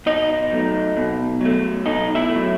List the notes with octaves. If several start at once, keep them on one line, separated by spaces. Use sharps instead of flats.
B2 D#4 D#5
F#3 A3
B2
F#3 A3
B2 D#4 D#5
E4 E5
A3
F#3